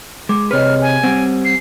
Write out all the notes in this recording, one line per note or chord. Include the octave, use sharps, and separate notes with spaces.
G#3 D6
C3 G#4 B4 C#5 D#5 F6
G#5
G3 C4 F#5
C7